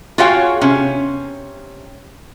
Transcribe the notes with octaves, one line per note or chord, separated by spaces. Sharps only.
F4 F#4 G#4 C#5 F5 G5
C3 C#4